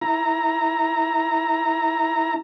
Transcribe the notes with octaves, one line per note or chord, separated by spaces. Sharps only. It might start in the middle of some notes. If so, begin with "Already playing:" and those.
E4 A#5